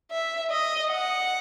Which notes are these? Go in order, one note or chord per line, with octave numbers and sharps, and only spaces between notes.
E5
D#5
F#5